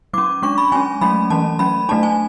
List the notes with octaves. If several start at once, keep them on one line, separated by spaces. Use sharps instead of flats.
F#3 C#4 D6
G#3 D4 C#6
B5
G#3 C#4 G#5
F#3 A3 C#4 B5
E3 A3 C#4 A5
F#3 C#4 B5
F#3 A3 D4 A5
G#5